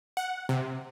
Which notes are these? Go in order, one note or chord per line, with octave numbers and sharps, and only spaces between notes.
F#5
C3